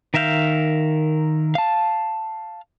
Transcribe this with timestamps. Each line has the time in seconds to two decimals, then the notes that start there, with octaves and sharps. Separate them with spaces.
0.14 D#3 A#4 E5 F5 G6
1.55 F5 A5